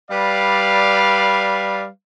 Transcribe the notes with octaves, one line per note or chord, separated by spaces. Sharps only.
G3 B4 D5 F5